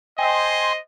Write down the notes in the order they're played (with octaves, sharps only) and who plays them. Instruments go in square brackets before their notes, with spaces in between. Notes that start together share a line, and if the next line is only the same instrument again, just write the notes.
[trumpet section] C5 D#5 [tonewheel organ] G5 G#5 C6